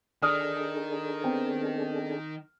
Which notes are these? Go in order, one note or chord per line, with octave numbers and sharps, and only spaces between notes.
D#3 D4 G#4 A4 D5 D#6 F6
B3 C4 G5